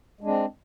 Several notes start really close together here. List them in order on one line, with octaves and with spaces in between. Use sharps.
G#3 D4 C4